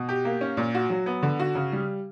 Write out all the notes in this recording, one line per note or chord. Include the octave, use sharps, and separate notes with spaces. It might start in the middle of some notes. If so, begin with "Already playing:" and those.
Already playing: B2
G4
A#3
C#4
A#2
F#4
F#3
B3
D3
F#4
C#3
G3